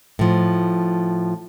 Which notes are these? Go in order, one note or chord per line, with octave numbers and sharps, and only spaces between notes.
A2 F3